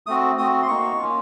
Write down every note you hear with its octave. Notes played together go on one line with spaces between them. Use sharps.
A3 C4 F#4 D#6
A3 C4 F#4 D#6
C6
A#3 D#4 F#4 C#6
A#3 C#4 F4